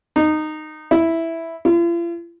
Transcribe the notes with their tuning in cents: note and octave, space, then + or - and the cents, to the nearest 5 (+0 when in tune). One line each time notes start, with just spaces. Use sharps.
D#4 -15
E4 +0
F4 -45